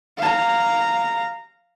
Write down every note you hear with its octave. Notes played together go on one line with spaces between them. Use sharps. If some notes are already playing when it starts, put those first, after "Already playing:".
F5 A#5